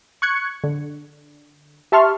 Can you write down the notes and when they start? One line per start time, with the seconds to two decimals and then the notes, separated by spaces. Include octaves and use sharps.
0.22 C#6 F#6 G#6 C#7
0.64 D3
1.92 G4 E5 A5 C6 C#6 F6